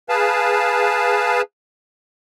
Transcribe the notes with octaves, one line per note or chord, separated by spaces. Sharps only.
G#4 B4 F5 A5